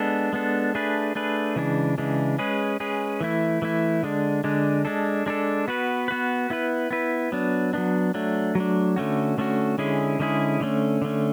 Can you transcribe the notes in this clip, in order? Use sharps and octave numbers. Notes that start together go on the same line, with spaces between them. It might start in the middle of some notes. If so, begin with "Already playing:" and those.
Already playing: G#3 B3 D4 A4
G#3 B3 D4 A4
A3 D4 G#4 B4
A3 D4 G#4 B4
C#3 E3 G#3 D4
C#3 E3 G#3 D4
G#3 C#4 G#4 B4
G#3 C#4 G#4 B4
E3 A3 E4
E3 A3 E4
D3 G#3 D4
D3 G#3 D4
G#3 D4 A4
G#3 D4 A4
B3 F#4 B4
B3 F#4 B4
B3 E4 B4
B3 E4 B4
F#3 B3 D4
F#3 B3 D4
F#3 A3 D4
F#3 A3 D4
D3 A3 C#4 F#4
D3 A3 C#4 F#4
D3 G#3 C#4 E4 G#4
D3 G#3 C#4 E4 G#4
D3 A3 C#4
D3 A3 C#4